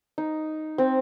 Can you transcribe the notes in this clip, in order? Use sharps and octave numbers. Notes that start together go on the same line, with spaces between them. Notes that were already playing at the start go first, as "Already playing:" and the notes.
D#4
C4